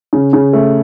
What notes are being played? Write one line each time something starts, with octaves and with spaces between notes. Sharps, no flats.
C#3
C#3
A3